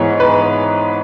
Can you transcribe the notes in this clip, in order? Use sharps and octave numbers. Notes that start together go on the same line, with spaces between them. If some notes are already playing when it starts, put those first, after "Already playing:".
Already playing: G#2 E3 G#3 B3 C#5
B4